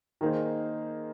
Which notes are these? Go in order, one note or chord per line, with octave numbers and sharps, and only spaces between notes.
D#3 A#3 D#4 G#4 C5